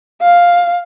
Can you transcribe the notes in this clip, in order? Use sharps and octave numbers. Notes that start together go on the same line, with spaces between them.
F5